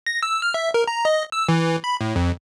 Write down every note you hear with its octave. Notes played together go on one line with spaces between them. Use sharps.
A#6
E6
F6
E5
A#4
A#5
D#5
E6
E3
B5
A2
F2